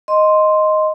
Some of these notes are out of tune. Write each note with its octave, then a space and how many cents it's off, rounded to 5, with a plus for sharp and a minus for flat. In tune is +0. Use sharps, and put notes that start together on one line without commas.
D#5 +0 C6 +0